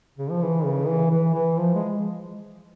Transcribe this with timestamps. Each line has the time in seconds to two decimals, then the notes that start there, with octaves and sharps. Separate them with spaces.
0.18 C#3
0.31 F3
0.42 E3
0.65 C#3
0.88 E3
1.11 E3
1.34 E3
1.58 F3
1.75 G#3